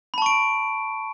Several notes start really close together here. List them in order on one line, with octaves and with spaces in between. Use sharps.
B5 A5 C#6 D7